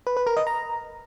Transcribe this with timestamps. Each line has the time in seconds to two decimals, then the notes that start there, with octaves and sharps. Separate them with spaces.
0.07 B4
0.17 B4
0.27 A#4
0.37 D#5
0.47 A#5